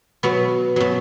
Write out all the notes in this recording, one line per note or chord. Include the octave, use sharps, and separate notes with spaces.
B2 F#3 B3
B2 F#3